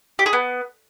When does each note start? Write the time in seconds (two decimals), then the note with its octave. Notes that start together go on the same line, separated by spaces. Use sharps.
0.19 G4
0.26 G#4
0.33 B3